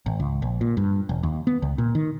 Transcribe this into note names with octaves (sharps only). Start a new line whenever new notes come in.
G#1
C#2
A#1
A#2
G2
E1
D#2
B3
C#2
A#2
D#3